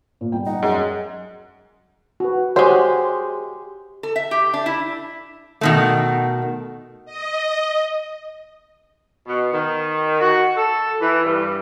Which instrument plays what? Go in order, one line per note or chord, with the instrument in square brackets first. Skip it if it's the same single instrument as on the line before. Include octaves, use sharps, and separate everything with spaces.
[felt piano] A#2
G3 G5
[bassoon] D#4 [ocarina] F#5
[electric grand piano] F#2 [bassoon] G#3
[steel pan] F#4 B4
[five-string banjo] G#3 C5 [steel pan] F#4 C#5 C6 [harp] G4
[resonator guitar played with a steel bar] A4
E5
G4
D4
E4
B2 D#3 A3
[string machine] D#5
[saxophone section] B2
D#3
F#4
A4
E3
G2